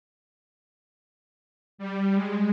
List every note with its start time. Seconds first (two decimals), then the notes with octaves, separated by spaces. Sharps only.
1.78 G3
2.15 G#3